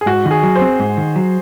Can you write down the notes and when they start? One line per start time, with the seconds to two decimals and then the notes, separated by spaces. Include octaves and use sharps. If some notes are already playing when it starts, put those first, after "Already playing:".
0.01 G#4
0.06 G#2 F#4
0.25 D#3 F#4
0.31 G#4
0.43 F#3
0.56 C5
0.61 C4
0.80 G#2
0.97 D#3
1.16 F#3